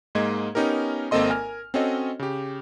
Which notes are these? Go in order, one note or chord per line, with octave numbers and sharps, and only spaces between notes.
G#2 G#3 A#3 D#5 G#6
B3 C#4 D#4 G4 A#4
G#1 A#3 C4 A4 D#5 C6
A#4 G#5 F6
C4 C#4 F#4 A4 C#5 D#5
C#3 G4